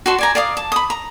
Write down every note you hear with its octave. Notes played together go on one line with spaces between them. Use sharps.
F#4 A4 A5 C6
D5 G#5 A#5
D5 F5 D6 D#6
A5
B5 D#6
A#5